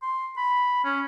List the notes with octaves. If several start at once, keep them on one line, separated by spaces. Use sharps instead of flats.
C6
B5
C#4